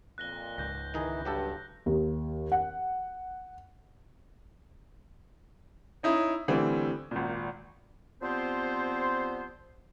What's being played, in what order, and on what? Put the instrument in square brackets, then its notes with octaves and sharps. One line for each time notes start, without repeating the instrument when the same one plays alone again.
[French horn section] F2 A#2 [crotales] F#6 A#6 G7
[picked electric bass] C#2 G#2 [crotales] G6 A#6
[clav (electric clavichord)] D#3 D#4 G#4 [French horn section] E3
[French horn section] G2 [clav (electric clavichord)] F#3 G4 A4
[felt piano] D#2
F#5
[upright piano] C#4 D#4 E4
A2 D3 E3 G3 C4
G#1 A#2
[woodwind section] F3 G3 B3 C4 C5